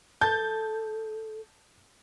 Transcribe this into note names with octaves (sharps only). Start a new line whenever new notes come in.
A4 A5 G6